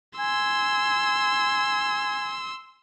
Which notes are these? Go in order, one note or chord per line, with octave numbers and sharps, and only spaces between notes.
G#5 C6 E6